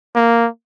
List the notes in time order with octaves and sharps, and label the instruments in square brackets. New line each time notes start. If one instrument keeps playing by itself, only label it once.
[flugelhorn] A#3